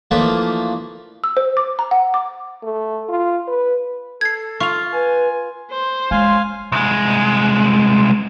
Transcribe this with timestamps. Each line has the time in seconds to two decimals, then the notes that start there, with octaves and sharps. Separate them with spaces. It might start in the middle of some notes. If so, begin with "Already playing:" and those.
0.11 E3 F3 A3 A#3 D4 F4
1.24 E6
1.37 C5
1.57 D6
1.79 A#5
1.91 F#5
2.14 D6
2.63 A3
3.09 F4
3.48 B4
4.21 A4 G#6 C7
4.60 F4 C#6 F7
4.93 B4 G#5
5.71 C5
6.11 G#3 C#4 F4 F5 G#5
6.72 C2 G#3